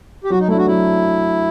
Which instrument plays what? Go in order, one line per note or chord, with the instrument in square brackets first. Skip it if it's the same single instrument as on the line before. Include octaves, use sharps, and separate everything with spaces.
[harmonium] G4
[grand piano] F#3 [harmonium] F#4
[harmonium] D#4
[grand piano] A3 [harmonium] E4
[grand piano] D4
[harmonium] F#4
[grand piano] F#3 [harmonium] E4